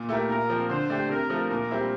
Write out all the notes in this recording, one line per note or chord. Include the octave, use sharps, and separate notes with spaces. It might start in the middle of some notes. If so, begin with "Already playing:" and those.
Already playing: A#2
A3 E4 G4 A#4
A#2 A#4
F3 C4
D3 C5
A3 D4 G4
C3 A#4
F3 A3
A#2 A#4
G3 C4 E4